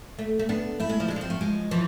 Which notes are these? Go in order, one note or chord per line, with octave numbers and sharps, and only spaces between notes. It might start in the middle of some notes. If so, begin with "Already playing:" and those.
A3
A3
B3 D4
A3 E4
G#3
F3
G#3 D4
F3 C4
A3
G#3
E3 F3